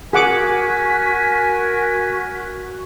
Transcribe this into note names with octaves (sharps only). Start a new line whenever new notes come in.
F#4 G#4 A#4 F#5 G#5 D6 B6